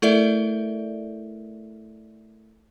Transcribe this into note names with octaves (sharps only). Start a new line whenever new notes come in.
A3 E4 A4 A#4 D5 E5